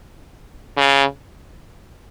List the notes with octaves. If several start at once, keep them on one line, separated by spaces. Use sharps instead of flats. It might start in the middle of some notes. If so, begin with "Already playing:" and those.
C#3